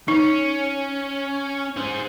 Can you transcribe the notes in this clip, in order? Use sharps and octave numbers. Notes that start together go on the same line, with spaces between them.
C#4 D#4
G#4 C5